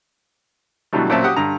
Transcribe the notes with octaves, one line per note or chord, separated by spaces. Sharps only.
B2 D3 E3 F#3 G3 A3
A#2 F#3 C4 C#4 E5 A5
F#4 G4 F#5 D#6
G2 D3 A#5